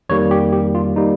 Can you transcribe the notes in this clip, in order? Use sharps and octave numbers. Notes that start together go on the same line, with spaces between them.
F2 D#3 G3 A#3 C#5
G4
G4
F4
D#3 G3 A#3 D#4